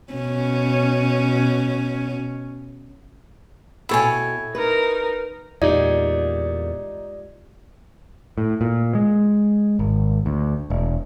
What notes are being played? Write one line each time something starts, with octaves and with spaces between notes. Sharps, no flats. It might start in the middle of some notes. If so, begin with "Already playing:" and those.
B2 C#4
B2 E4 A4 C#5 G5 G#5
D#4 A#4 B4
E2 A#2 G#3 D#4 F4 G4 D5
A2
A#2
G#3
G#1
D2
E1